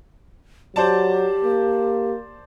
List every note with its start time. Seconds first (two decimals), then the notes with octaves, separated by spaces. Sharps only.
0.76 F#3 G4 C5 D5 A5
1.45 A#3